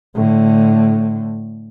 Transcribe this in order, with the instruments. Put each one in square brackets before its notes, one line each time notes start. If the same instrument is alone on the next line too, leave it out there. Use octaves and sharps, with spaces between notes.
[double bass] A2 D3